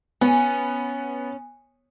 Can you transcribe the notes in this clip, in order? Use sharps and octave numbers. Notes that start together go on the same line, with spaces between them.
B3 C#4